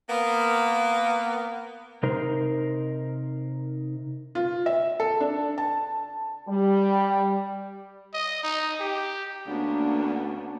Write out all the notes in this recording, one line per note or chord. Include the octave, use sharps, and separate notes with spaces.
A#3 B3
C3 D#4 A#4 C5
F4
E5
A4
D4
A5
G3
D#5
D#4
G4
D2 A#3 B3 C#4 D4